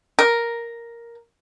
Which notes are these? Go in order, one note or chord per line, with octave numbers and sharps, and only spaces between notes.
A#4